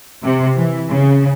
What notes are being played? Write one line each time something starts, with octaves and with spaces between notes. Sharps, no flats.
C3
E3
C#3